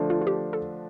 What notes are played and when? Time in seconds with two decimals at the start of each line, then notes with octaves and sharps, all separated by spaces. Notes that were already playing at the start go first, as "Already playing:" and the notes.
Already playing: D3 F3 A3 D4
0.10 F4
0.21 F4
0.27 G4
0.53 A4